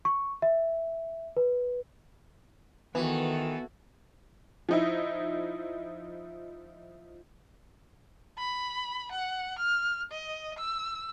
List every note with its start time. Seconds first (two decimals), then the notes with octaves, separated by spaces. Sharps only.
0.05 C#6
0.42 E5
1.37 B4
2.95 D#3 E3 B3 F#4 A4
4.69 F3 D#4 E4
8.38 B5
9.12 F#5
9.59 F6
10.11 D#5
10.59 E6